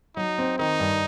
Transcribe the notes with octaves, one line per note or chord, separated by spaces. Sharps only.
F#3 D#4
C4
D#3 D#4
G2